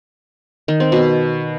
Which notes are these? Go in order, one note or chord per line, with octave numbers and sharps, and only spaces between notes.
D#3
C4
B2